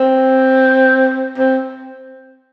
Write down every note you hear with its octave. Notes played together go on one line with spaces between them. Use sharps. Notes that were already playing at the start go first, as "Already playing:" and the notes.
Already playing: C4
C4